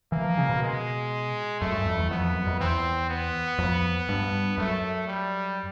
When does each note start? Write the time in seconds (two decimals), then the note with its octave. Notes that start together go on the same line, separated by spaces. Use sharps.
0.12 E3 A#3
0.24 F3
0.38 C#3
0.49 B2
0.62 G#3
1.61 F#2 A3
1.73 G2
1.86 F2
1.99 E2
2.10 F2 B3
2.35 F#2
2.47 F2
2.60 E2 C4
3.09 B3
3.59 F2
4.09 G2
4.58 F#2 A3
5.08 G3